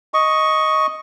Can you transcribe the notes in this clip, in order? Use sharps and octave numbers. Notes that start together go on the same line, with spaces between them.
D#5 C#6